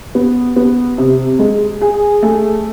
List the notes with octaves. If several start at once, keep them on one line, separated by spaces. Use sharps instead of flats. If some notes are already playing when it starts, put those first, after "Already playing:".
B3
B3
C3
G#3
G#4
A3